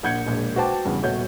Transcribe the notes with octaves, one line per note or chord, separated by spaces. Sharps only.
A#1 F#5 G6 G#6 C#7
E1 A#1
F#4 B4 C5 G5 A5 D6
E2 G2 C#3
D#1 B2 A3 F#4 C#5 G6